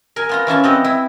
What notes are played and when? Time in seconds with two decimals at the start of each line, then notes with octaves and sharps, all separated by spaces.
0.16 A#4 G#5
0.29 B3 F4 A#5
0.47 E3 C#4 F4 A5
0.64 B3 C4 D#5
0.84 E4